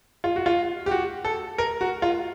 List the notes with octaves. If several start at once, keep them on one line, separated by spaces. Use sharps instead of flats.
F4
F#4
F4
G4
F#4
A4
A#4
F#4
F4